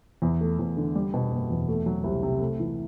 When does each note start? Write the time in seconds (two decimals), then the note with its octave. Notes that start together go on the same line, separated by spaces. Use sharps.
0.22 E2
0.41 A3
0.59 E2
0.77 D3
0.95 G3
1.14 B2
1.31 F#1
1.50 E2
1.69 A3
1.86 F#3
2.04 C2
2.23 C3
2.40 A3
2.60 E3